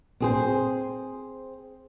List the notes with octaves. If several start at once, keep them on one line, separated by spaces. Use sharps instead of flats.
C4 G#4 C5